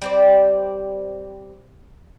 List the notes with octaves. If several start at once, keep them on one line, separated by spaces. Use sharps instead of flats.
G3 C4 D5